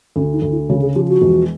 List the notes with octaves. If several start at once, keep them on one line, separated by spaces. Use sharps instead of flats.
D2 C#4
D#4
D2
E4
C#3 F#4
G#4
F3 G4
F#4
E1